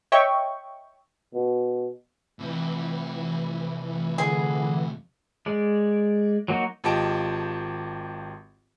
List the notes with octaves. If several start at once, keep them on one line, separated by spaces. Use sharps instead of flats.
C#5 D#5 E5 G5 C#6
B2
F2 C3 E3
D3 G#4
G#3 D5
F#3 A#3 D#4 F#4
G#1 F4 G4 D#5 A5 D7